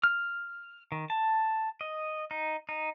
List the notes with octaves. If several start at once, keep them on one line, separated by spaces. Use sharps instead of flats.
F6
D#3
A5
D#5
D#4
D#4